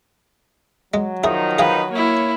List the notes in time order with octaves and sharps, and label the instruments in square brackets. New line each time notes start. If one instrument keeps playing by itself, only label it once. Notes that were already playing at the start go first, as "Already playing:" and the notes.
[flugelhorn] F#3 [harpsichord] G#3
[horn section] D#3 F3 D#4 [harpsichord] E4 G#4
[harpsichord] G#4 F5 G5 [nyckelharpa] B4
[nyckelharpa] A#3 E4 [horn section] C#5